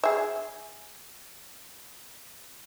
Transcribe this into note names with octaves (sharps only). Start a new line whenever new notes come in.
G#4 E5